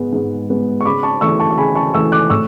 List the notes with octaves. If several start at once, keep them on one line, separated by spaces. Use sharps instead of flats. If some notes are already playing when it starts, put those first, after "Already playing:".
Already playing: G#2 G#3 B3
G#2
G#3 B3
C#6
C#3 B5 D6
A5 C#6
E3 A3 C#6 E6
A5 C#6
C#6
C#3 G#5 B5
A5 C#6
E3 A3 C#6 E6
D6 F#6
A2 C#6 E6